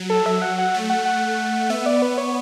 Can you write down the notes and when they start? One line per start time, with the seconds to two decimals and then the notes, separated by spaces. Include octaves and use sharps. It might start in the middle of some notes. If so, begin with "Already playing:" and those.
Already playing: F#3
0.10 A4
0.26 F#3 E5
0.42 F#5
0.58 F#5
0.74 A3
0.90 F#5
1.05 F#5
1.69 B3 E5
1.86 D5
2.02 B4
2.18 C#5